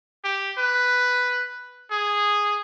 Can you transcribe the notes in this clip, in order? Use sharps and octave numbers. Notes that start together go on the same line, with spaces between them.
G4
B4
G#4